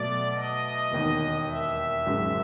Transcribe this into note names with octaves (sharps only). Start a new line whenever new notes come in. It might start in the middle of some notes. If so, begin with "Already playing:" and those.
Already playing: B2 F#3 A3 D5
D#5
E1 D#2 D#3
E5
G#1 F#2 C#3 F#3